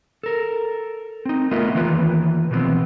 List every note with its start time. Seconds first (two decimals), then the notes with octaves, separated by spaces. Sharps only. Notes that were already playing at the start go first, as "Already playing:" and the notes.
0.23 A4 A#4
1.25 C4 D#4
1.51 A3 B3 F4 A#4 D#5 E5
1.75 D#3 E3 A#3 F4 B4
2.51 B2 E3 F3 G3 B3 C4